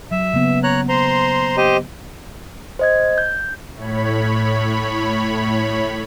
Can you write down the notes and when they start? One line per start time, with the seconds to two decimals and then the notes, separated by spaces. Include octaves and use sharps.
0.11 F#3 E5
0.34 C#3 A#3 B3
0.63 C#5 A#5 F#6
0.89 C5 A#5 C6
1.57 G4 C5 D#5
2.79 C5 D#5 G#6
3.18 G6
3.73 A2 C#5 B5